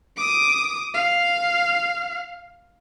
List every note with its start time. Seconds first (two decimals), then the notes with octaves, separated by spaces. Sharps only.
0.17 D6 D#6
0.94 F5